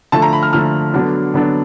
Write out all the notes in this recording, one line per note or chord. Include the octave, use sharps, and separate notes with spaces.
D3 F3 A3 A5
A#5
B5
F6
D3 F3 A3 F6
D3 F#3 B3 D4
D3 F#3 B3 D4